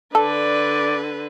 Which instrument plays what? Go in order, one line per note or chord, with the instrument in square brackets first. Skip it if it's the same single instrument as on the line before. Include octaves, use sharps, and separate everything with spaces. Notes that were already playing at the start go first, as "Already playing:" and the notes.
[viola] D3 B4 [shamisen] A4 [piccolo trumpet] D5